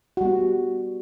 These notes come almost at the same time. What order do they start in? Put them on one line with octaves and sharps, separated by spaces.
F#4 G3 B3